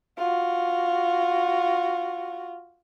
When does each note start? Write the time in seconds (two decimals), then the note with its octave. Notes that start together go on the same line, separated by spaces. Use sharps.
0.18 F4 F#4